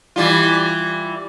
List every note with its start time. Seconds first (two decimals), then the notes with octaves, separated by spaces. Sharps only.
0.16 E3 G3 F4